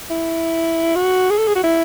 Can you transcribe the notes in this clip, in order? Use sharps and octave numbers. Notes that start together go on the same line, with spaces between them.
E4
F#4
G#4
A4
G#4
F#4
E4